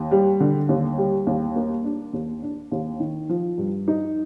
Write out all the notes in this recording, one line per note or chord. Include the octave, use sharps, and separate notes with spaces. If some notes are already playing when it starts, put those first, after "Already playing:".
Already playing: D#2
G3
D3
D#2
G3
D#2
A#3
D4
D#2
D4
D#2
D#3
F3
G2
D#4